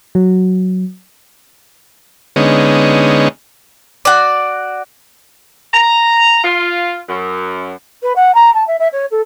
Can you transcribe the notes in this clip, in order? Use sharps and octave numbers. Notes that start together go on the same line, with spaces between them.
F#3
D3 G#3 B3 C#4 D#4
F#4 D5
A#5
F4
F#2
B4
F#5
A#5
A5
E5
E5
C#5
A4